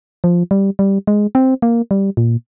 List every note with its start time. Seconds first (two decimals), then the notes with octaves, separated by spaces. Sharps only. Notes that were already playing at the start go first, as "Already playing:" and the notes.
0.24 F3
0.51 G3
0.79 G3
1.07 G#3
1.35 C4
1.62 A#3
1.91 G3
2.17 A#2